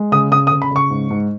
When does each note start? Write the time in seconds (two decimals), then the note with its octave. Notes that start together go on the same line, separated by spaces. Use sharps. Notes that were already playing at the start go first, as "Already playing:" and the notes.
Already playing: G#3
0.12 C#3 D#6
0.31 C#3 D#6
0.47 D#6
0.52 C#3
0.62 B5
0.71 C#3 C#6
0.90 G#2
1.10 G#2